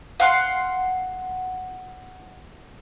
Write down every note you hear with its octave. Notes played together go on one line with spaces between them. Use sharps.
F5 F#5 C6